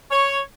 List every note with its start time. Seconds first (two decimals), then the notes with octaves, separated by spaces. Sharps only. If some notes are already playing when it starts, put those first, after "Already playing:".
0.10 C#5